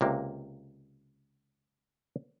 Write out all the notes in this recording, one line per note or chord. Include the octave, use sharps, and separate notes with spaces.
C#2 C3 A#3